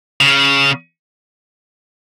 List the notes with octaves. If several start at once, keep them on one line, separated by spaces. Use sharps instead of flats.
C#3